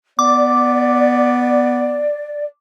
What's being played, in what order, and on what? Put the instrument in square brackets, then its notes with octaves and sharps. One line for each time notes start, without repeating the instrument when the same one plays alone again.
[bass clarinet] B3 [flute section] D5 [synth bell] D6